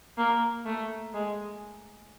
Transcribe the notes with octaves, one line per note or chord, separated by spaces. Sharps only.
A#3
A3
G#3